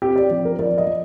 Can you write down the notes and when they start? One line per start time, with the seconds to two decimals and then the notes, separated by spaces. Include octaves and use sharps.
0.02 C4 G4
0.16 D5
0.31 F3
0.45 A#4
0.59 F3 D5
0.78 D#5
0.87 F3